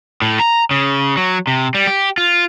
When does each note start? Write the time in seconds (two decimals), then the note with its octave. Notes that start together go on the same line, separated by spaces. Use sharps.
0.22 A2
0.40 A#5
0.71 C#3
1.17 F#3
1.47 C3
1.75 G3
1.87 G4
2.18 F4